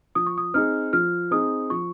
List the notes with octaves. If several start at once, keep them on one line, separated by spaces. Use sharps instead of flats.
F3 D#6
C#6
D#6
C4 D#4 G#4 F6
F3 F6
C4 D#4 G#4 D#6
F3 C#6